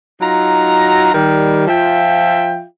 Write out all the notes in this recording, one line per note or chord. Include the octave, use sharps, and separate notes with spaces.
F#3 D#4 F4 A#5
D#3 G3
F3 F4 E5 G5